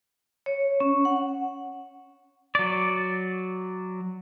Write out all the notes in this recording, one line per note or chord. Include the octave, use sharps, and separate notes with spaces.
C#5
C#4
F#5
F#3 D5